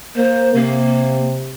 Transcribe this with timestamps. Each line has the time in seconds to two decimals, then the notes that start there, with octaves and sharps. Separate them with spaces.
0.17 A#3 C5
0.55 C3 A#3